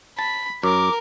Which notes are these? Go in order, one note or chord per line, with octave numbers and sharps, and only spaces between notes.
A5 B5
F#2 A#4 D6